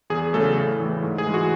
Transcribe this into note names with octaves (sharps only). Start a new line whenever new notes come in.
E2 G#4
C#3 F#3 A3 A4
A2
E3 A3
G#2
G#4
E3 G#3
F#4